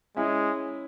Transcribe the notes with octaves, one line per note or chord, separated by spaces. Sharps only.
G#3 C#4 E4